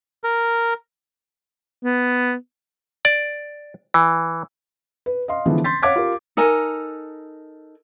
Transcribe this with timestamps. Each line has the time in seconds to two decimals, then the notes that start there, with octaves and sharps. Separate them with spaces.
0.24 A#4
1.84 B3
3.05 D5
3.94 E3
5.06 B4
5.28 D#5 F5 C6
5.45 D3 E3 F3 G#3 B3
5.64 C6 G6 A6 B6
5.82 C#5 F5 F#5 D6 G#6 B6
5.96 F4 G4 A#4
6.37 D#4 A4 A#4 G#5